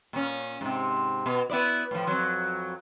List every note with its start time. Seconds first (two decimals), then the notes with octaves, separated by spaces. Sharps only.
0.13 A#2 C#4
0.61 G#2 C3
1.26 B2
1.50 B3 E4 D5
1.91 A2 F3
2.07 F2 F#3